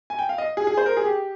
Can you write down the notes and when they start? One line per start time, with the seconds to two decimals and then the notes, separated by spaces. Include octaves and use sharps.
0.10 G#5
0.19 G5
0.29 F5
0.38 D#5
0.57 G#4
0.67 G#4
0.77 C5
0.86 A#4
0.97 G#4
1.06 G4